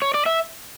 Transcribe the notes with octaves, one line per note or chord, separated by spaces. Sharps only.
C#5
D5
E5